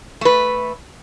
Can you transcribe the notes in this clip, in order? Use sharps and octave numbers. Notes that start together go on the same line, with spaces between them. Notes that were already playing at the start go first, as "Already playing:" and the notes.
A3 B4